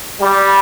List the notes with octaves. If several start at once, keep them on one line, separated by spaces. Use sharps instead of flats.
G3